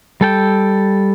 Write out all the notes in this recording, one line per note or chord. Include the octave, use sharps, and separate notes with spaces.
G3 A4 G5